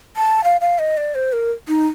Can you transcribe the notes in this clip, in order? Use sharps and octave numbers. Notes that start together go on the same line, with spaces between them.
A5
F5
F5
D#5
D5
C5
A#4
D#4